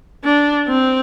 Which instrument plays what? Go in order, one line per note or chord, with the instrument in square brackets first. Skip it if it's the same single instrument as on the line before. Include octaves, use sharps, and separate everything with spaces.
[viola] D4
C4